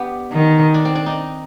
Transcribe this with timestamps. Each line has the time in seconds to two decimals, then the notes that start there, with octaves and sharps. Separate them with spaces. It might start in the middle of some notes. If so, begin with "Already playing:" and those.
Already playing: B3 D4 G4
0.32 D#3
0.74 D4
0.85 C4
0.95 D4
1.06 D#4